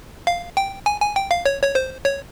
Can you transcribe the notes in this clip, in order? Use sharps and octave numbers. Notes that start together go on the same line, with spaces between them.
F5
G5
G#5
G#5
G5
F5
C#5
C#5
C5
C#5